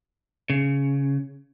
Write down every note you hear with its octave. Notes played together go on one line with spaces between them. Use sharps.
C#3